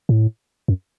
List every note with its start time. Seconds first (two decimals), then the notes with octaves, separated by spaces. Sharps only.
0.09 A2
0.68 F#2